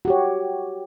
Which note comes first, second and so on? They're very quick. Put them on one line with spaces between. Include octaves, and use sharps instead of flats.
F#4 G4 C#5